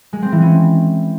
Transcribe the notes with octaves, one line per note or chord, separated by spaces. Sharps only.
G#3
C4
E3
C#4